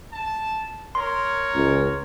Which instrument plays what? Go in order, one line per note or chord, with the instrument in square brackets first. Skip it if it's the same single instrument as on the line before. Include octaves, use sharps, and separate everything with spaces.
[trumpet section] A5
[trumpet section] A#4 C#5 [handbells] C6
[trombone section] C#2